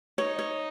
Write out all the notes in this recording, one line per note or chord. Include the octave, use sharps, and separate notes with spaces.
D#4 C#5
C#5